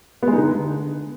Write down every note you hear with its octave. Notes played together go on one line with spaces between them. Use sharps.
B3
G#3
D#4
D3